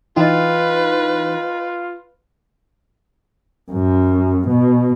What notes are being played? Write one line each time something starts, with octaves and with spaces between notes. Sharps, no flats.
E3 D#4 F4 B4 D#5 G5
F#2
B2